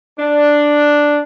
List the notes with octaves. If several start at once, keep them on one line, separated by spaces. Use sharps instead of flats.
D4